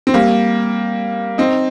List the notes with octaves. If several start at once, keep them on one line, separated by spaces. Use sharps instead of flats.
C4
G3 A#3
C4 D#4